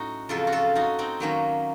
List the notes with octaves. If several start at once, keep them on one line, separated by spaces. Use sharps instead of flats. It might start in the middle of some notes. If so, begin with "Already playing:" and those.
Already playing: A2 F#3 C#4 D#4 F#4
F2 C#3 F#3 F4 A4
F#4
F4 A4
D#4 F#4
C4 D#4
F#2 D#3 F#3 A#3 C#4